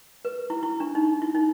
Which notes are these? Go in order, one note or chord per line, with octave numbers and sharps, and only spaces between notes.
B4
E4
E4
D4
D#4
E4
D#4